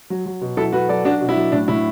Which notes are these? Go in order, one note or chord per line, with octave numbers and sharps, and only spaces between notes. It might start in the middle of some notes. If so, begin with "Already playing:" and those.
F#3
F#3
B2
F#3 E4 A4
F#3 F#4 B4
F#3 A4 D5
F#3 D4 F#4
B2
E4
F#3
A2 D4
A2 E4